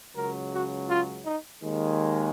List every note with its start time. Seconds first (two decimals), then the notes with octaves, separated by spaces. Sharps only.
0.15 C#2 C#3 F#3 A#4
0.52 F#4
0.89 F4
1.25 D#4
1.61 D#2 D#3 G#3